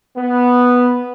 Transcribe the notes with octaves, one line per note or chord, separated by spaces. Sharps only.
B3